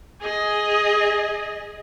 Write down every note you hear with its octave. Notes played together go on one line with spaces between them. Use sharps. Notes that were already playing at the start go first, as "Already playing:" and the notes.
G#4 D#5